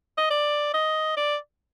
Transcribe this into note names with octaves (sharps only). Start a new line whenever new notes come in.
D#5
D5
D#5
D5